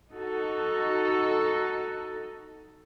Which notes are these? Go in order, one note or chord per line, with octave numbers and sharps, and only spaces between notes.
D#4 F#4 A4